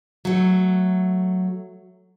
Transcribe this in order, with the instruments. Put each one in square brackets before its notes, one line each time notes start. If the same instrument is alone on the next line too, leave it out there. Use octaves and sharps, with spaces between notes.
[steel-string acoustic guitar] F#3 A3